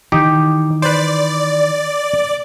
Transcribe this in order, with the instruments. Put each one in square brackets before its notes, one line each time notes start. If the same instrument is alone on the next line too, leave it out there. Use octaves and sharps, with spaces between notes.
[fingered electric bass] D#3 E3 [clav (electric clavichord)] D#4 G4
[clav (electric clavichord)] B4 C5 [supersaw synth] D5